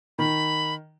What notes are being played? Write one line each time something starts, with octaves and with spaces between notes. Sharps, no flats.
D#3 B5